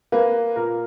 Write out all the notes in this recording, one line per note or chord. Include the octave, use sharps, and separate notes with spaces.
A#3 B4
A#2 A#4